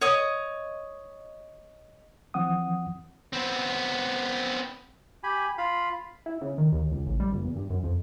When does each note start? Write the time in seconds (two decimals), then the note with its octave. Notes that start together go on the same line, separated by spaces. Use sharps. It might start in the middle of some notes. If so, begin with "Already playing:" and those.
0.01 C#5 D#5 D#6
2.34 E3 F3 C4 F#5 D#6
3.33 B3 C4
5.23 G4 G#5 B5
5.58 F4 F5 B5
6.26 E4
6.41 C#3
6.58 D#3
6.72 D#2
6.92 C#2
7.06 A1
7.20 G3
7.32 F#1
7.44 E2
7.56 G2
7.70 F#2
7.84 F2